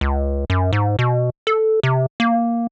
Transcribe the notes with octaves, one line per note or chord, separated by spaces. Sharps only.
C#2
F#2
G#2
B2
A4
C3
A#3